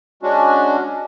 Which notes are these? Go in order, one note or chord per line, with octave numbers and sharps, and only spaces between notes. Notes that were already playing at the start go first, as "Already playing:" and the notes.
G#3 C#4 D4 F#4